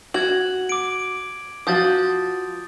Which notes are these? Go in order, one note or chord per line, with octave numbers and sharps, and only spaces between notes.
F#4 G#6 F#7
D6 D7
F3 F#4 D#6 G6 A6